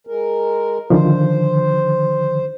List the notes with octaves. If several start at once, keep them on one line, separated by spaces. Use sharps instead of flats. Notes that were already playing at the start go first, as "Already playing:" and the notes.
G#3 A#4
D3 D#3 F3 C5